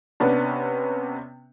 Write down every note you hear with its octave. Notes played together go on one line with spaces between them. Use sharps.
C3 B3 C#4 D4